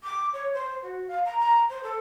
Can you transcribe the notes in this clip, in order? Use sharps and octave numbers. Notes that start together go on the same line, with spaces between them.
D6
C#5
C5
F#4
F5
A#5
A#5
C5
A4